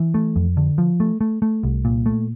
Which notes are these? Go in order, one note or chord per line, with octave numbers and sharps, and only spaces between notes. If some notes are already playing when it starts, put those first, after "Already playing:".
Already playing: E3
A3
F2
D3
F3
A3
A3
A3
C2
A#2
A3